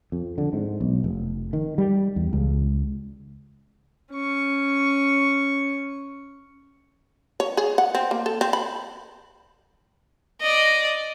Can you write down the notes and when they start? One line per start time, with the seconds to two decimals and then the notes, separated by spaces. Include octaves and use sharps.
0.12 F2
0.38 D3
0.53 G#2
0.81 B1
1.04 F1
1.53 D#3
1.78 G3
2.16 E2
2.33 C#2
4.12 C#4 C#6
7.40 C#5
7.57 G#4
7.78 F#5
7.95 C4
8.11 A#3
8.26 A4
8.41 C4
8.53 B5
10.41 D5 D#5